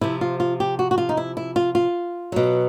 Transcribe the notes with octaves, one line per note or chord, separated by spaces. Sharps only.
C3 F3 E4
F4
F4
G4
F#4
F#4
F4
D#4
E4
E4
F4
F4
B2 F#3